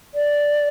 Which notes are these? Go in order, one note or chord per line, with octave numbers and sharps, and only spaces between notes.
D5